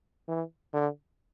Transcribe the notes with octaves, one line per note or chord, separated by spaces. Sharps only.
E3
D3